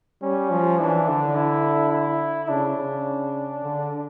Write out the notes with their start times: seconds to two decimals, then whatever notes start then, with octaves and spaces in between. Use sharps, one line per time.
0.22 G3 C#4
0.50 F3
0.78 E3 D4
1.08 D3
1.35 E4
1.92 E4
2.49 C#3 D4
2.77 C#3
3.63 D3